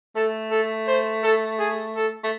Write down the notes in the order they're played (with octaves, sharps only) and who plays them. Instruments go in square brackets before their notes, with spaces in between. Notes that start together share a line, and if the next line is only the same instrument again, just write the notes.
[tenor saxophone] A3 [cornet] A4
[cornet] A4
C5
A4
G#4
A4
[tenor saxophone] A3